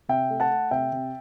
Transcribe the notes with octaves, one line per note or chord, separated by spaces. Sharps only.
C3 E5 G5
A3
F#5 A5
A3
C3 E5 G5
C3